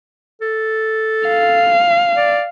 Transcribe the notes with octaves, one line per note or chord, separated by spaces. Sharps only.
A4
F5
D5